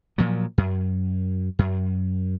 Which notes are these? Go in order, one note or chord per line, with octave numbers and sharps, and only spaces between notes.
A#2 F3 F#3
F#2
F#2